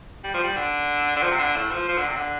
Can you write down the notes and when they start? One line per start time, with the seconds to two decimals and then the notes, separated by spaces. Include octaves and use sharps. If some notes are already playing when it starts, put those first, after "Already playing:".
0.24 G3
0.34 F3
0.44 G3
0.56 D3
1.16 D3
1.23 F3
1.31 C3
1.39 D3
1.56 A2
1.72 F3
1.88 F3
1.98 D3
2.07 C3
2.16 D3